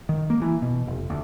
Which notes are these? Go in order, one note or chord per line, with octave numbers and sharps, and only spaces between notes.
D#3
A#3
E3
B2
F1
D2